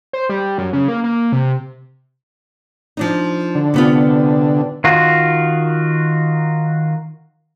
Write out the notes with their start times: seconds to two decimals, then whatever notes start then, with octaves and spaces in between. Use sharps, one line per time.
0.13 C5
0.29 G3
0.58 F#2
0.73 C#3
0.88 A#3
1.04 A#3
1.32 C3
2.97 F3 D4 D#4
3.55 D3
3.74 C3 B3 F4
4.84 D#3 F4 F#4